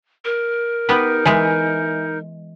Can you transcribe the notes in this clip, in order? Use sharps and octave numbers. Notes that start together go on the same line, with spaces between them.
A#4
B3 D#4 G4 B4
E3 G#3 E5 G#5